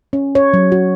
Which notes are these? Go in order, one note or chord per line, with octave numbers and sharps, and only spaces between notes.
C#4
C#5
F#3
F#4